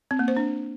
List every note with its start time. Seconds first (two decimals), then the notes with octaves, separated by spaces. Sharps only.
0.11 C4
0.19 A#3
0.28 C5
0.37 D4